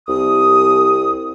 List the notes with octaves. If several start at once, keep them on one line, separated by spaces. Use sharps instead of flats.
C2 D#6